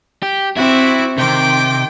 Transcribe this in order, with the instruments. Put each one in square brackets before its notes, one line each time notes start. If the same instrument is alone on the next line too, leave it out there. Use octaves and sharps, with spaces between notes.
[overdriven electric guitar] G4
[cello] C4 [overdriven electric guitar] E4 [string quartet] F#4 E5 D6
[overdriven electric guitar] C3 [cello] D#3 [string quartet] G5 C6 D6